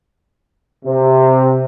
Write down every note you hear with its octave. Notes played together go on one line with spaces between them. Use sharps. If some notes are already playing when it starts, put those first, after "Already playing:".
C3